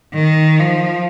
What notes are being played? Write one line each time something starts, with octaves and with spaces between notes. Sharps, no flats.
D#3
F3